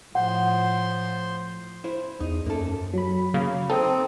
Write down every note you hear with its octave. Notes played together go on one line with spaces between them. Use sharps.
A2 F3 C5 F#5 C6
E4 C5
E2 D#4
F#2 A#3 A4
F#3 B5
C#3 A#3
C4 D#4 A4 C5 D#6